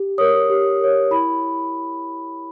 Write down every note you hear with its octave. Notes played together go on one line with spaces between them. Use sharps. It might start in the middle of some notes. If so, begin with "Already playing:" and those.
Already playing: G4
A#4 C#5 D#6
G4
A#4 C#5
E4 B5